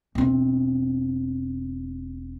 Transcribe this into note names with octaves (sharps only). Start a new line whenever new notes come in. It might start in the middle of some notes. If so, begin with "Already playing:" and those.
E1 C4